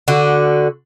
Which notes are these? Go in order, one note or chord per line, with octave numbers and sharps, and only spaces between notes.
D3 F#4